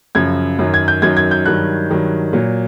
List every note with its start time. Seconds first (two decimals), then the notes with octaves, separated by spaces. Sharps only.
0.15 F#2 C#3 F3 G#6
0.59 F#2 D#3 F#3
0.74 G#6
0.88 G6
1.02 F#2 D#3 F#3 G#6
1.17 G#6
1.31 G6
1.46 G2 D#3 F#3 F#6
1.90 G2 D#3 F#3
2.33 A#2 F#3